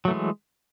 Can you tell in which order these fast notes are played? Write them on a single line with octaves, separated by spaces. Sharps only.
F#3 A3 E3 G#3